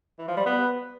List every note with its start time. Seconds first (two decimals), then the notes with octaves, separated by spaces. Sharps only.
0.19 E3
0.28 F3
0.37 G3
0.46 B3